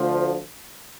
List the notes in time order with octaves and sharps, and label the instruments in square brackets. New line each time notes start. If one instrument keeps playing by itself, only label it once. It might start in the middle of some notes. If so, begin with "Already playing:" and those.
Already playing: [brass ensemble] D2 D3 F3